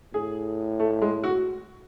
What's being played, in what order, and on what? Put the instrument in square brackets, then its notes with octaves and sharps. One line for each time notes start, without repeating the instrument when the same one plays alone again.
[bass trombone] A2 [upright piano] G#4
[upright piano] A3
G#3
F#4